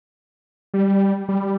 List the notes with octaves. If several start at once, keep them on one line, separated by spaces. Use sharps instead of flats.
G3
G3